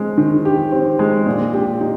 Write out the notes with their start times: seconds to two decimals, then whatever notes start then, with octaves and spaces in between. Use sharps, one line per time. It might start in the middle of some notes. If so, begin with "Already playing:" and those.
Already playing: G#3 C4
0.18 D#3
0.45 G4
0.72 C4
0.99 G#3
1.26 A#2
1.54 G4
1.81 D#4